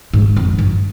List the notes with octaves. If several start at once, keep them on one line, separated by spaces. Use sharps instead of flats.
G#2
F2
G2